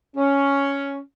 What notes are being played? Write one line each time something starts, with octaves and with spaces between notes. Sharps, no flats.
C#4